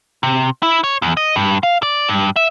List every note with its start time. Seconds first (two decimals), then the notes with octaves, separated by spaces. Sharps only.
0.23 C3
0.63 E4
0.84 C#5
1.02 E2
1.17 D#5
1.36 G2
1.63 F5
1.83 D5
2.09 G2
2.36 E5